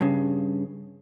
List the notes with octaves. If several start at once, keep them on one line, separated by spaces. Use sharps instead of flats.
G2 C#3